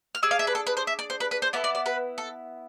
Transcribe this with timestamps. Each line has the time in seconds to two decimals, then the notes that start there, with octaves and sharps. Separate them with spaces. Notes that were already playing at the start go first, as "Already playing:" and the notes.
0.15 F6
0.23 D4 G#4 E6
0.31 F5
0.39 E5
0.47 B4
0.55 A4
0.67 B4
0.77 C5
0.87 E5
0.99 D5
1.10 C5
1.20 B4
1.31 B4
1.42 C5
1.53 B3 E4 A4 D5
1.64 D5
1.75 D5
1.86 B4
2.18 A4